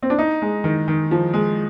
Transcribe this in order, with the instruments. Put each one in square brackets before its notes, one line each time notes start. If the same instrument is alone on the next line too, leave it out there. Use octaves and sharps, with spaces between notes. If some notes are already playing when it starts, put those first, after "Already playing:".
[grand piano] C4
D4
D#4
G#3
D#3
D#3
F3
G#3